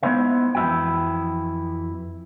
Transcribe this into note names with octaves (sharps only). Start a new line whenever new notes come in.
G#3 B3 D#4 E4 C5 E5
F2 E3 E4 F#4 G5